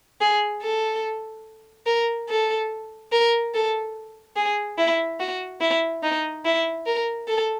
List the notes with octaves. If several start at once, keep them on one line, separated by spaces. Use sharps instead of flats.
G#4
A4
A#4
A4
A#4
A4
G#4
E4
F#4
E4
D#4
E4
A#4
A4